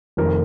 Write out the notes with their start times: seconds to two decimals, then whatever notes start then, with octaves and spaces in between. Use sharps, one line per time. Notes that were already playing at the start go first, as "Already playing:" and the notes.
0.17 F1 F2 C3 D#3 A#4